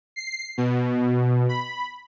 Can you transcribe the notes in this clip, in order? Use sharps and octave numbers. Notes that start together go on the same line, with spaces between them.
C7
B2
B5